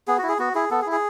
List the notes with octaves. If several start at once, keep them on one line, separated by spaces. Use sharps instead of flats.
B3 G#4
F#4
E4
G#4
B3 F#4
E4 G#4
B3 A4
G#4
E4
G#4